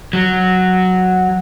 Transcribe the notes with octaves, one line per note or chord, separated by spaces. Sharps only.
F#3